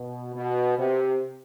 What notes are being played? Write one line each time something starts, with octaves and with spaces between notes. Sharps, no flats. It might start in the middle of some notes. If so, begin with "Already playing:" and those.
Already playing: B2
B2
C3